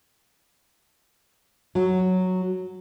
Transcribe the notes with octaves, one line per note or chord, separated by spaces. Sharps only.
F#3